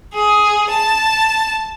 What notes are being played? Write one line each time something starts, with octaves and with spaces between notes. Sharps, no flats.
G#4
A5